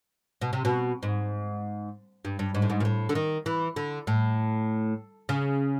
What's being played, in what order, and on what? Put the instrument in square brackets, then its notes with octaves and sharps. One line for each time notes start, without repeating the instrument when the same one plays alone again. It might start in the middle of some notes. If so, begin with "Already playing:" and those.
[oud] B2
C3
B2
G#2
G2
G2
G#2
A2
G#2
A#2
A2
D3
D#3
E3
D3
A2
C#3